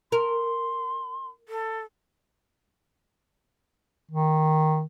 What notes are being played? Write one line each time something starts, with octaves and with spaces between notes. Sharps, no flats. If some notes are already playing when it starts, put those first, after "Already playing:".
A#4 C6
A4
D#3